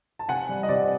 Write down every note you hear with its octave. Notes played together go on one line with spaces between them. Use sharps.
A5
C3 F#5 G#5
G3
D#5
C3 D5